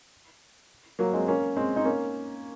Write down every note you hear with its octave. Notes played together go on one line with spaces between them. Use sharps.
F#3 A#3
G#3 C4
A#3 C#4
G#3 C4
C4 D#4
A#3 C#4